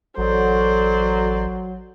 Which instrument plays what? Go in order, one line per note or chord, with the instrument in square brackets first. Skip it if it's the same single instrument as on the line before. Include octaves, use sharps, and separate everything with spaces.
[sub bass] A1 [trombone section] F#3 [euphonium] A4 [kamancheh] C5 D5